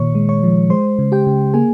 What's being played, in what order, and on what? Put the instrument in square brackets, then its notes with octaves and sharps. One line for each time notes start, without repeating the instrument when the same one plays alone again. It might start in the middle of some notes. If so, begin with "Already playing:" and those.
Already playing: [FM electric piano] A#2 D#3 C#5 C#6
G#3
C#5 C#6
F3
G#3 C5 C6
C#3
G4 G5
C#3
A#3 G#4 G#5